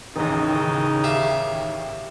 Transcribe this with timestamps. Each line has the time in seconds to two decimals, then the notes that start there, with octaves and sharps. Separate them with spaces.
0.16 A1 D#2 C#3 D#4
1.04 G4 E5 F5